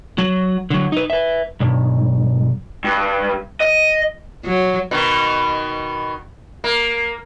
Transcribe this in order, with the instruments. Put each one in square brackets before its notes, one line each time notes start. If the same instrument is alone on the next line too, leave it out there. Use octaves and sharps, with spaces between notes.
[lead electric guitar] F#3 F#4
D3 F#3
D#4 B4
B4 E5
B1 G2
G2
D#5
[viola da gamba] F#3
[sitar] B2 D#3
A#3